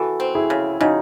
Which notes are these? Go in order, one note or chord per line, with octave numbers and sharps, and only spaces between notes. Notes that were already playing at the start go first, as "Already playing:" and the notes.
Already playing: E3 F#4 A4
C4
E4 G#4
C#3
C#3 D#4 F#4